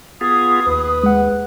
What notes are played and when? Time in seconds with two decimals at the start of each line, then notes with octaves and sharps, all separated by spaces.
0.21 B3 F4 G#4 D#6
0.67 D#2 B4
1.03 G#3 F#5